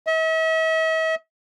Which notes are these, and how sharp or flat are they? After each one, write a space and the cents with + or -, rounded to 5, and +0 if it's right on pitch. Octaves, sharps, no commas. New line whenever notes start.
E5 -45